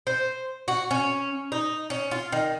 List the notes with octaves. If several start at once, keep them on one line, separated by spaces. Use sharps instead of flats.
C5
F#4
C#4
D#4
C#4
F4
D#3